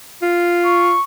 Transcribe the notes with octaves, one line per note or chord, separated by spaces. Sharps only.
F4
C#6